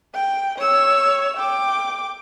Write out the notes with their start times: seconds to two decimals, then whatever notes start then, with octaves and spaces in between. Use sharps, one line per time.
0.15 G5
0.59 C#5 E6
1.37 G5 D6